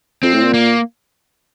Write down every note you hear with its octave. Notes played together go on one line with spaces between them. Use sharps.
F2 C4
A2
A#2
A#3